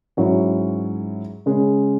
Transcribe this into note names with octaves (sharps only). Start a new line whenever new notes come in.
G#2 F#3 C#4 E4
C#3 G#3 C#4